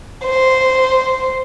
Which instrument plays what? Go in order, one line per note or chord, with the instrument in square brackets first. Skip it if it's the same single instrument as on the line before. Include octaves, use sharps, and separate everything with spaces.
[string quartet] C5